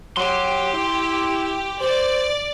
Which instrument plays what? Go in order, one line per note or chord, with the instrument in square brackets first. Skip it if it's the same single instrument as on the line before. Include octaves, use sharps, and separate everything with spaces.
[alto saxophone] F#3 [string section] G4 [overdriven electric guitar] C6
[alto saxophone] E4
[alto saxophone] C5 [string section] D5